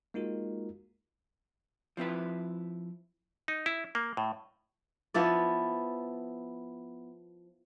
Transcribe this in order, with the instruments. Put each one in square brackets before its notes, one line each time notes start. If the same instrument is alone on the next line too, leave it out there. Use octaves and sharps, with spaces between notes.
[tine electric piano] G#3 A#3 D#4 F4 F#4 A#4
[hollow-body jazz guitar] F3 C4 E4 B4
[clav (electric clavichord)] D#4
E4
A#3
A2
[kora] F3 B3 E4 D5